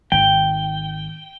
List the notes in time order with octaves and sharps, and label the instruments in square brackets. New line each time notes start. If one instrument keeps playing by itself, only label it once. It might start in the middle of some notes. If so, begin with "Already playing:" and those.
[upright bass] G#1 D#3 [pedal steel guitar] G5